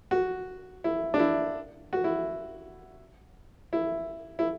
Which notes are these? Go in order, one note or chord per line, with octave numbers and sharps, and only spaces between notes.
F#4
E4
D4
E4
F#4
E4
E4
E4